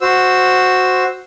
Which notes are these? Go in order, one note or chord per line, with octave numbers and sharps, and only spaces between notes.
F#4 C5 E6